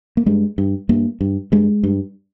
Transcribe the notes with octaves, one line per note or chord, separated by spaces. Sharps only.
A#3
G2 G#3
G2
G2 A#3
G2
G2 G#3
G2